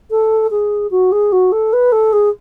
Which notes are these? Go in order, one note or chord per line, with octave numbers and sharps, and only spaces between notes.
A4
G#4
F#4
G#4
F#4
A4
B4
A4
G#4